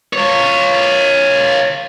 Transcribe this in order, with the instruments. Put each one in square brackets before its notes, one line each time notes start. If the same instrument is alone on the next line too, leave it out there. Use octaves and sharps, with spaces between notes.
[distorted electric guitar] F4 C#5